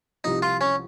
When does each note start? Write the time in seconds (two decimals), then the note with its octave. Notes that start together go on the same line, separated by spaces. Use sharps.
0.24 C2 C3 F3 D#4
0.42 F4
0.61 C#4